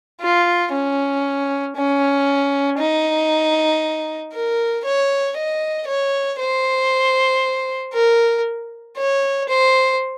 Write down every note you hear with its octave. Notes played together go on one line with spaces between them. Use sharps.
F4
C#4
C#4
D#4
A#4
C#5
D#5
C#5
C5
A#4
C#5
C5